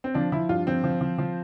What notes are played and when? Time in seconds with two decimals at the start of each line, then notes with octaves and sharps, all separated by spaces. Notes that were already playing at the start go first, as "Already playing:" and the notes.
0.04 C4
0.14 F3 D4
0.32 F3 E4
0.49 G2 F4
0.67 F3 C4
0.84 F3
1.01 F3
1.18 F3